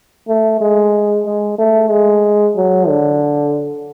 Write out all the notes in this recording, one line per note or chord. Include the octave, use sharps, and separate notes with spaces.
A3
G#3
G#3
A3
G#3
F#3
D3